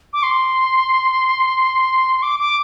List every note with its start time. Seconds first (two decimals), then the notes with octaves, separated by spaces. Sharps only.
0.13 D6
0.23 C6
2.22 D6
2.39 D6